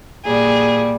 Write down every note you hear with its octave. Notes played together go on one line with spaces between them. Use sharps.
A#2 G3 G#4